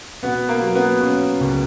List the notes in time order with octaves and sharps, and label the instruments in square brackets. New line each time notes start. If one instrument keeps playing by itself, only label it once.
[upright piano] B2 [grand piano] B3
[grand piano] A#3
[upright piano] F#3
[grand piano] B3
[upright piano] C#4
C#2